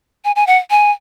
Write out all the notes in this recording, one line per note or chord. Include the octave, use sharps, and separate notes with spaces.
G#5
G#5
F#5
G#5